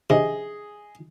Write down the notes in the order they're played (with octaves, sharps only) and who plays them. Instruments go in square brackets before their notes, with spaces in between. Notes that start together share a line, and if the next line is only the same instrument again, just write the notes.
[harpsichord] C3 [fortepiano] G#4 D#5